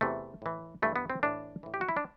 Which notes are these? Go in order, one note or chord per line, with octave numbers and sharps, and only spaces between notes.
E2 C3 E3 A3
A2 E3
G2 E3 A3
B3
C4
A2 E3 D4
A2 E3
G4
F#4
E4
D4